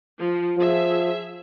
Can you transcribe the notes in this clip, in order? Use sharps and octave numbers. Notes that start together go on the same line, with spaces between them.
F3
F3 G#4 E5